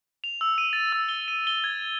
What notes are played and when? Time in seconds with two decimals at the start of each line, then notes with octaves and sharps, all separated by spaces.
0.24 F7
0.41 E6
0.58 D#7
0.73 A6
0.92 E6
1.09 G7
1.28 D#7
1.47 G7
1.64 G#6